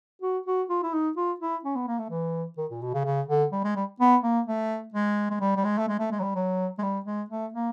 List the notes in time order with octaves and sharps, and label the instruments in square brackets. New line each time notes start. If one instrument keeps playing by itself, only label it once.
[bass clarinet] F#4
F#4
F4
E4
D#4
F4
E4
C#4
B3
A#3
A3
E3
D#3
A#2
B2
C#3
C#3
D3
G3
G#3
G3
B3
A#3
A3
G#3
G#3
G3
G3
G#3
A3
G#3
A3
G#3
F#3
G3
F#3
G#3
G3
G#3
A3
A#3